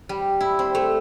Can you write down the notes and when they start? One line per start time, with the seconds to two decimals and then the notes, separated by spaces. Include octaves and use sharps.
0.09 G3
0.40 E4
0.59 C4
0.75 A3